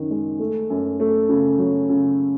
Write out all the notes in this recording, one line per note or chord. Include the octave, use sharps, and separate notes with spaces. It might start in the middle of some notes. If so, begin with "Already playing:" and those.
Already playing: F#2 D#3
G#3
A3
F#2
A3
C#3
F#3
C#3